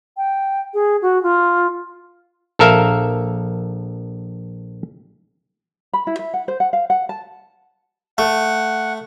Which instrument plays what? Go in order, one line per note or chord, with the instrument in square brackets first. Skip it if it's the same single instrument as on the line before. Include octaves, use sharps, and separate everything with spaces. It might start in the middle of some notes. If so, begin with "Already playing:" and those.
[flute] G5
G#4
F#4
F4
[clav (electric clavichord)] A#1 A4 A#4 E5 F5
[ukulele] B5
E4
E5
F#5
C5
F#5
F5
F#5
A5
[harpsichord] A3 [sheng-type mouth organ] F#5